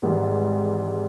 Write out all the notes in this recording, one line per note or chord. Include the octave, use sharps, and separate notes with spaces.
G#1 G#2 E3 G3